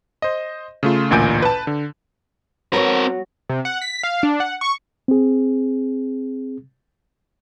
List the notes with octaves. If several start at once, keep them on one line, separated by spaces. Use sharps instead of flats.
C5 D#5
C#3 A3 F4
A1 D2 A#2 G#5 G6 D7
B4 A5
D3
F#3 B3 C4 F#4 A#4
C3
F#5
B6
F5
D4
F#5
C#6
C4 G#4